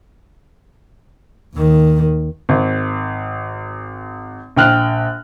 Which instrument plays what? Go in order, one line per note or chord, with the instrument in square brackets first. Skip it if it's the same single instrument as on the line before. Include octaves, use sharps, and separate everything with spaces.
[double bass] D#2 D#3
[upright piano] G#1
A#1 G5 F6 F#6